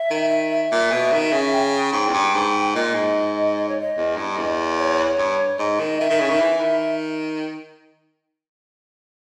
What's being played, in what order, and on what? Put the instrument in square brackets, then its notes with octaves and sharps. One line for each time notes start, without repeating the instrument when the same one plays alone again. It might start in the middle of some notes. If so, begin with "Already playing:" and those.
Already playing: [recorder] E5
[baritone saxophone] D#3
[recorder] E5
E5
[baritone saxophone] A#2
B2
D#3
C#3
[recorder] G5
[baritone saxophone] G#2 [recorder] G5
[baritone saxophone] E2
G2
G#2
[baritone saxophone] A#2 [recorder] D#5
[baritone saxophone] G#2
[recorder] D#5
C#5
D#5
[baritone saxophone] E2
G2
E2
[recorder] C#5
[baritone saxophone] G2
[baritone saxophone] G#2 [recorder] D#5
[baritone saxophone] D#3
[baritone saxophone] D#3 [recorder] E5
[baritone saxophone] D#3
C#3
D#3
E3
D#3